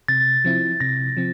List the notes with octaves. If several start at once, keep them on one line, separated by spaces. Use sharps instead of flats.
C3 A6
F3 C4 E4
C3 A#6
F3 C4